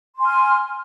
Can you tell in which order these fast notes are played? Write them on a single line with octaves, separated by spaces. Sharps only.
C6 G#5 F6